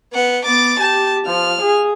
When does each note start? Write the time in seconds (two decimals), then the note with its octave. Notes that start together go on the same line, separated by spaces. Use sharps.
0.13 B3 F#5
0.45 B3 D6 A6
0.80 G4 A5
1.27 F3 F6
1.61 G#4